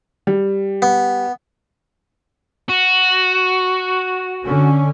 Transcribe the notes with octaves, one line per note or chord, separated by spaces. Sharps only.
G3
B3
F#4
D3 C#4